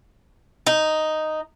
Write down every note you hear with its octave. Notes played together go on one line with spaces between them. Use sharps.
D#4